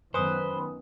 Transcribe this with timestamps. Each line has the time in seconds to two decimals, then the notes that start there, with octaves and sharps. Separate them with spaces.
0.14 F#2 D#3 B3 B4 C5 G#5 D#6